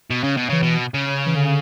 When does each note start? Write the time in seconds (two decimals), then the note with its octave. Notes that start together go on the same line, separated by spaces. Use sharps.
0.10 B2
0.24 C#3
0.37 B2
0.49 C#3 E3
0.63 B2
0.94 C#3
1.26 E3
1.35 D3